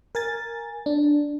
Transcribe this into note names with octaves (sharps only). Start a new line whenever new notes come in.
A#4 G#5 A6
D4